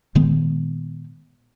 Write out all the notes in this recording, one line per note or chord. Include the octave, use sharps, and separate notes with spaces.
A#2 D#3 G#3 B3